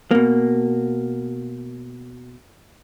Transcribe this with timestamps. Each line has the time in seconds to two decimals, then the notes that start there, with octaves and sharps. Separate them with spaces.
0.11 B2 A#3